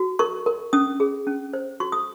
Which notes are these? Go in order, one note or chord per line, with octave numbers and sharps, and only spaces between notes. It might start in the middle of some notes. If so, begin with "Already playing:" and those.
Already playing: F#4
A#4 C#6
A#4
C#4 D#6
G#4
C#4
C5
F#4 C#6
D#6